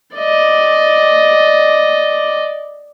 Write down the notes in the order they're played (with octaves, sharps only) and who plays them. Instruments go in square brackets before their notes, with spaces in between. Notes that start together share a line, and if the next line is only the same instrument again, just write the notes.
[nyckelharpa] D5 D#5